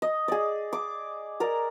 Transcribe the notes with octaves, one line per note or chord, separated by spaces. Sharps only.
D#5
G#4 D5
D6
A#4 D5 A#5